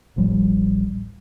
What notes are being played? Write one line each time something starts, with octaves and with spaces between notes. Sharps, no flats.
D1 A1 F3 G3